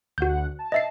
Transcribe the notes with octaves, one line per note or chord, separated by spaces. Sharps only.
D2 F#4 F#5 G6
A5
D#5 E5 C7